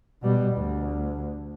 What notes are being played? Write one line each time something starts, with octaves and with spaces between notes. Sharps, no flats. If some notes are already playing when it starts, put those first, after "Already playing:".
B2 G3
D2